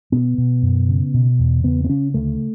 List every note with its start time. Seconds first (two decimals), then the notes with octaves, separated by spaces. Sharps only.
0.12 B2 B3
0.38 B2
0.63 F#2
0.89 C#3
1.14 B2
1.39 E2
1.64 C#3 B3
1.84 B3
1.89 C#3 C#4
2.14 D2 A3